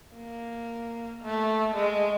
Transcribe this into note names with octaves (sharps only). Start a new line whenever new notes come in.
A#3
A3
G#3